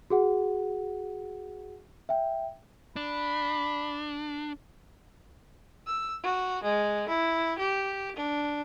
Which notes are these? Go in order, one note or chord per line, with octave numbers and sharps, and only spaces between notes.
F#4 G#4 F#5
E5 G5
D4 B5
E6
F#4
G#3
E4
G4
D4